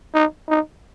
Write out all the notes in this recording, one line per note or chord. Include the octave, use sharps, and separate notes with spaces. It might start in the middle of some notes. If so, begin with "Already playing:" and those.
D#4
D#4